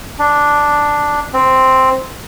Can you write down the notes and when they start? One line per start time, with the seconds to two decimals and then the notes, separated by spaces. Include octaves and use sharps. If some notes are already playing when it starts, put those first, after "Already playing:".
0.19 D4
1.33 C4